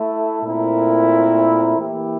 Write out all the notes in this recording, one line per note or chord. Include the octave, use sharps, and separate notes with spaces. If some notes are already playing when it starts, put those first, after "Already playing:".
Already playing: A3 E4 A4
A#2 A3 C4 E4 A#4
E3 A#3 E4 G4